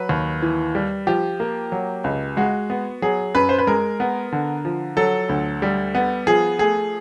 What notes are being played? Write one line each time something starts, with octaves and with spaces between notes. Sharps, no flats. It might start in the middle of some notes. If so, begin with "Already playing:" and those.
Already playing: F#3 B4
D#2
E3
G3
F3 G4
A#3
F#3
C#2
G#3 F#4
B3
F#3 G#4
F#2 B4
C5
B4
G#3 A#4
B3
D3
F3
F#3 A4
D2
G3
B3
F3 G#4
A3 G#4